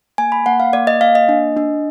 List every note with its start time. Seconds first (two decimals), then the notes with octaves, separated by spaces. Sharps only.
0.18 A#3 G#5
0.32 B5
0.46 A#3 F#5
0.60 F5
0.73 A#3 D5
0.87 D#5
1.01 A#3 F5
1.15 D#5
1.29 D4
1.57 D4